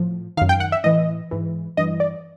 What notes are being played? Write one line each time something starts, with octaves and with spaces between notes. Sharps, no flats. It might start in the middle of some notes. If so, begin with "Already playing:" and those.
Already playing: A2 F3
F#2 D#3 F5
G5
F#5
E5
A2 E3 D#5
G#2 E3
G2 E3 D#5
D5